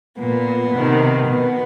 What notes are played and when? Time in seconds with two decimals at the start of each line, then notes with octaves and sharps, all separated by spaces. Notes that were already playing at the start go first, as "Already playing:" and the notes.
0.18 A#2 B3
0.74 C3 D#3
1.28 B2 B3